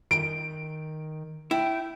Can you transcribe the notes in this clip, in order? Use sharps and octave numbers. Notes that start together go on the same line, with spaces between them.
D#3 D7
E4 G5